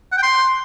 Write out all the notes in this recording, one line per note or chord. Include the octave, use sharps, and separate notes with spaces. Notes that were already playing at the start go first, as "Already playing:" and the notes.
F#5
G5
C6